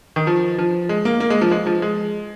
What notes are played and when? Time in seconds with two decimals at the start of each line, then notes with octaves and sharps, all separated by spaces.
0.16 D#3
0.27 F3
0.58 F3
0.89 G#3
1.05 A#3
1.20 A#3
1.30 G#3
1.41 F3
1.51 G#3
1.66 F3
1.82 G#3